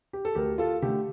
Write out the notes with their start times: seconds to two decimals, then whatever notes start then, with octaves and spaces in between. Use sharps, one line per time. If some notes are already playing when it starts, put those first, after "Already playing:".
0.13 G4
0.25 A4
0.35 D2 G4 A#4
0.58 F4 A4
0.82 D3 A3 G4